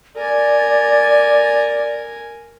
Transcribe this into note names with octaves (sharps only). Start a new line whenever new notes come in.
A#4 D5 G#5